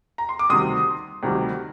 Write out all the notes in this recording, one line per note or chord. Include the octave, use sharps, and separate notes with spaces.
A#5
C6
D6
D2 C3 D#3 G3 C6 D#6
D2 C3 D#3 G3